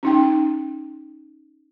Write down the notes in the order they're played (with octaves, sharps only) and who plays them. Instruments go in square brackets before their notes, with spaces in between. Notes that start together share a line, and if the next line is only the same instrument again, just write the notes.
[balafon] C#4 D#4 G5